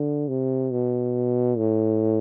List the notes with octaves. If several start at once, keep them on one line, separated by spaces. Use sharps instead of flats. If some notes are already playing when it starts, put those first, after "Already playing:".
Already playing: D3
C3
B2
A2